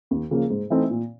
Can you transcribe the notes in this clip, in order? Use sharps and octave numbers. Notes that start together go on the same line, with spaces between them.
D#2
C#3 F3 A#3
G#2
E3 A3 C4 D#4
A#2